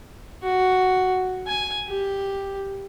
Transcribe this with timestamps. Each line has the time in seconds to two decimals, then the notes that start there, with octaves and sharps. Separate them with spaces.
0.43 F#4
1.47 G#5
1.87 G4